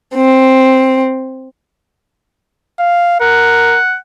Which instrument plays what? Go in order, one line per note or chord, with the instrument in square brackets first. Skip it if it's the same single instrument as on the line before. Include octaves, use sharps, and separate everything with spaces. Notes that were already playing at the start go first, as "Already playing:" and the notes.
[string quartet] C4
[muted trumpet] F5
[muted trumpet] A#4 [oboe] F#5